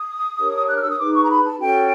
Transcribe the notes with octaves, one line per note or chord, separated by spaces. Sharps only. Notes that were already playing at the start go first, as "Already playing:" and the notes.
Already playing: D#6
D4 G4 A#4 C#5
F#6
F6
E6
D#6
D#4 G#4 B4 D6
C#6
A#5
B5
A5
C#4 F#4 A4 G5